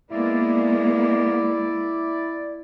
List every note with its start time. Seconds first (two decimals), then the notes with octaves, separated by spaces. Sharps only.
0.12 G#3 A#3 B3 E4 D5